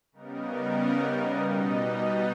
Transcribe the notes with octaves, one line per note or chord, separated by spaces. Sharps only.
C#3 G3 B3 D#4 A#4
B2 G3 B3 D#4